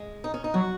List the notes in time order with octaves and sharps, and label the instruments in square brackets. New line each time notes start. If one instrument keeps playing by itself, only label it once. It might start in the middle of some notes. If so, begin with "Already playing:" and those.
Already playing: [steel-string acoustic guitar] G#3
D#4
C#4
D#4
[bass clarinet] F#3 [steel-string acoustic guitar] F#4